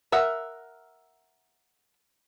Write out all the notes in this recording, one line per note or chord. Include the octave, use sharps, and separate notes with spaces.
A#4 E5 F#5